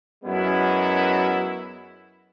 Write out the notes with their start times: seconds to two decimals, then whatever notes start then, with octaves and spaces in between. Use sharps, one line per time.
0.25 F#2 F#3 G#3 B3 E4